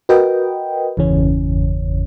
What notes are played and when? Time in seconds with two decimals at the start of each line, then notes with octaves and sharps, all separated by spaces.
0.09 F#4 A#4 B4 D#5 G5
0.97 G1 E2 C#3 E3 C#4